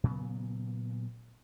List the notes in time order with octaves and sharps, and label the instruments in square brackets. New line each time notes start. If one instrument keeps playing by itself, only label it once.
[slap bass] A#2 C#3 F#3 B3